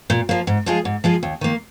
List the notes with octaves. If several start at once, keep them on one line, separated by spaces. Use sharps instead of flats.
A#2
F3 A#3
G#2
F3 G#3 F4 G#4
G#2
F3 G#3 F4 G#4
D#2
D#3 A#3